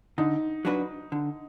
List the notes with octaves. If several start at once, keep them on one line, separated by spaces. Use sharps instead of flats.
D3 D#4
F#3 D4 F#4 B4
D3